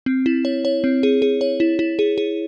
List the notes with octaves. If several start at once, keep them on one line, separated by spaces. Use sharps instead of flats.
C4
E4
C#5
C#5
C4
G#4
G#4
C#5
E4
E4
G#4
G#4